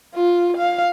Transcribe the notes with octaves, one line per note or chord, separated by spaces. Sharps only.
F4
F5